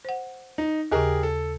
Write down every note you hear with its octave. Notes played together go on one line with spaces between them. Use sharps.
C5 F#5
D#4
D#2 C#3 G4 G#4 A#4
A4